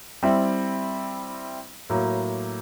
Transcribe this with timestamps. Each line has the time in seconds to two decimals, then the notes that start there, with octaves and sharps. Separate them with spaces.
0.23 G3 C4 E4
1.90 A2 F#3 A#3